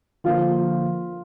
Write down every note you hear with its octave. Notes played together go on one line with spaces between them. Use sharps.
D3 F3 A#3 F4